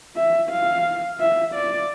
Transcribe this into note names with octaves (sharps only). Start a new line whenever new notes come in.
E5
F5
E5
D5